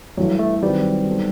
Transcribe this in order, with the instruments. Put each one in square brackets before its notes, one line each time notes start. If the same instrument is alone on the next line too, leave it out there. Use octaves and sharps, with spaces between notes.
[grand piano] G2 E3 A3 [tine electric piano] F#3
[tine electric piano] A3
[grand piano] D#3 F#3 C4 F#4 B4 [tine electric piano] G3
[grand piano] F#3 B3 D#4 A4 C5